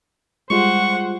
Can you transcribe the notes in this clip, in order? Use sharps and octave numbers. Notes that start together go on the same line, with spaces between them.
G3 G#3 F4 C5 F#5 C#6